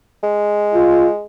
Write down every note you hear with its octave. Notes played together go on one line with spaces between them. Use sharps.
G#3
F4